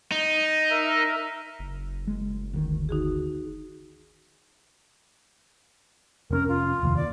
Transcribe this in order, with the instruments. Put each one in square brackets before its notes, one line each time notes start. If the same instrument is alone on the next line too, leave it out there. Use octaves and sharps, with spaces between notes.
[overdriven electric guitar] D#4
[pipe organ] A#4 E5
[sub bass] F#1
[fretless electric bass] G#3
D2 D#3
[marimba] D#4 F#4 G#4
[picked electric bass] F1 C4 C#4 [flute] A#4
[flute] F4
[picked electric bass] F1 D#2
[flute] D5